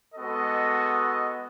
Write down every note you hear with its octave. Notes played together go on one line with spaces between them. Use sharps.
G#3 B3 F#4 A4 D#5